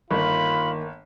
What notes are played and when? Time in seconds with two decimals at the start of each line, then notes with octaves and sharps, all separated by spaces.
0.11 G1 D#3 A#3 F4 B5